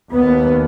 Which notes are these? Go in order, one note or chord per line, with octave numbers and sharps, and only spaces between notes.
D#2 B3